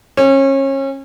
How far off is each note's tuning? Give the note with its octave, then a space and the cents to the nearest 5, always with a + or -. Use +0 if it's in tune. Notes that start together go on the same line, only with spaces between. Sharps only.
C#4 -30